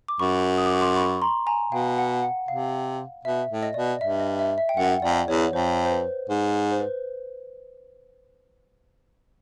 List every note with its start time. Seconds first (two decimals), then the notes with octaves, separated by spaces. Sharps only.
0.08 D6
0.19 F#2 B5 C#6
0.58 D#6
0.66 D6
0.73 C#6
0.81 C6 D6
0.96 B5 C#6
1.22 A#5 C6
1.47 G#5 A#5
1.72 B2 F5 G5
1.98 F#5
2.23 F#5
2.48 C3 F5
3.25 B2 E5
3.50 A2
3.63 D#5
3.74 B2 D5
3.86 D#5
4.01 G2 E5
4.20 D#5
4.39 E5
4.58 E5
4.69 G5
4.77 F#2 F#5
5.02 F2 D5
5.28 E2 C#5
5.53 F2 C5
5.85 C5
5.91 B4
6.29 G#2
6.71 C5
6.80 B4